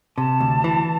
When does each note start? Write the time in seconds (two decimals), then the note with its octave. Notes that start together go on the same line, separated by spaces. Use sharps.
0.18 C3 A5
0.40 D2
0.64 E3